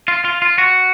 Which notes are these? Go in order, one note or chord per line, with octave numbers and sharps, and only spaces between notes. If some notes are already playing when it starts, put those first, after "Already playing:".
F4
F4
F4
F#4